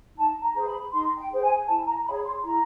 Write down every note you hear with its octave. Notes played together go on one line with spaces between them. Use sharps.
D#4 A5
A#5
G#4 C5
B5
D#4 C6
G5
G#4 C5
G#5
E4 A5
A#5
G#4 C#5 B5
C6
E4 A#5